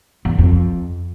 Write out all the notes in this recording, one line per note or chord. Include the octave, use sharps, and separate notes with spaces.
E2
F2